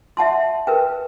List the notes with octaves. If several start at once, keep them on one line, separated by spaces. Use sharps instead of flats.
E5 F#5 A5 C6
A#4 B4 G5